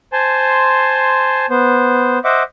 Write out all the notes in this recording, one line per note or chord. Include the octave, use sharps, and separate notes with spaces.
C5 G#5 A5 C6
B3 C5
C5 D#5 E5 F#5 D6